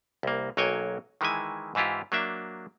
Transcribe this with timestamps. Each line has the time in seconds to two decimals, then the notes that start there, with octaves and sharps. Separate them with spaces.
0.23 C2 A#3
0.57 B1 F#3 A#3 C#5 G5 G#5
1.21 D#3 E3 G#3 E4 G#5
1.75 G#2 E3 E4 F4 G4
2.12 F#3 A#3 D4 E5